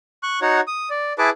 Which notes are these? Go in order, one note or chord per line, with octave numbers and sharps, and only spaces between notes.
C#6 F#6
D#4 F#4 C#5 F#5
D#6
D5
E4 G#4 B4 A5 D6